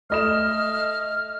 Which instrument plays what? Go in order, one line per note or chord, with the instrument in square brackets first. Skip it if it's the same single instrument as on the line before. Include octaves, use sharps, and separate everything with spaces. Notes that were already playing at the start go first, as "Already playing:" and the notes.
[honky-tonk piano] A3 D#5 E7 [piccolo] F6